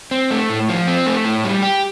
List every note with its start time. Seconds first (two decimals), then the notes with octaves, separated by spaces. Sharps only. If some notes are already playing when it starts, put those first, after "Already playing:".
0.11 C4
0.31 A3
0.50 A2
0.69 F3
0.87 C4
1.06 A3
1.25 A2
1.44 G3
1.63 G4